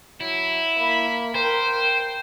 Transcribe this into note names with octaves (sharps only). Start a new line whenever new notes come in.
F#3 E4
A#3 B5
A#4 C5 G5